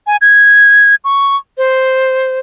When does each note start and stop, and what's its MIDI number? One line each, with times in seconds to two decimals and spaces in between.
0.07 0.17 80
0.21 0.95 92
1.04 1.36 85
1.58 2.40 72